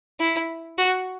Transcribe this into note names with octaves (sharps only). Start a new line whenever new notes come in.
E4
F#4